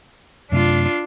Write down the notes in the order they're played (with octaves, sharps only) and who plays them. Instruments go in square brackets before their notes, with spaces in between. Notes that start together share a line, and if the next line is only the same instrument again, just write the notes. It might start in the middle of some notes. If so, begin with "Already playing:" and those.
[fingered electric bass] F#2 C3 A3 [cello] D4 F4